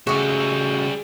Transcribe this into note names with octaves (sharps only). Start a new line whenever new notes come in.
C#3 G3 A3 F#4 G#4 D#5 E5